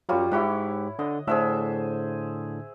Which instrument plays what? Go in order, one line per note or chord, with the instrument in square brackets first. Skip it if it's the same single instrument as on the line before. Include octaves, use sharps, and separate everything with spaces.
[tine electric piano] F#2 F#3 [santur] G3 F4 C#5
[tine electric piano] G#2 G4 [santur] E4 C#5 F#5
[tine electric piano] D3 [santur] D#5
[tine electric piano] A2 D3 D4 [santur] G#4 C5 E5